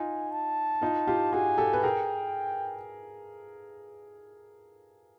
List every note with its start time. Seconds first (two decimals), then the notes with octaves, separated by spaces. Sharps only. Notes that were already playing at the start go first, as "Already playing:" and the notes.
Already playing: D#4 F4 G#5
0.31 A5
0.81 D#4 F4
1.07 F4 G4
1.33 F#4 G#4 G#5
1.58 G4 A4
1.73 B4
1.83 G#4 A#4 G5